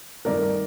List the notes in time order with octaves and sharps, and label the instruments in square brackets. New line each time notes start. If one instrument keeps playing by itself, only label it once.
[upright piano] G2 D#3 A3 A#4 D5